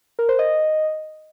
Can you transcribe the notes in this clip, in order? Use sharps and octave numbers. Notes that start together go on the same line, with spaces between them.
A#4
C5
D#5